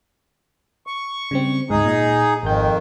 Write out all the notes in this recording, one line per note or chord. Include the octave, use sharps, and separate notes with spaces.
C#6
C#3 G3 C4
D2 G#2 D#4 G#4
A#2 D#5
G#1 F2 D#3 G6